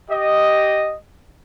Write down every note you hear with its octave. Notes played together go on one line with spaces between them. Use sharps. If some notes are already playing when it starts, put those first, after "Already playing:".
G4 D#5